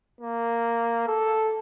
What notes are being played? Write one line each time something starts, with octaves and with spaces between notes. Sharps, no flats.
A#3
A4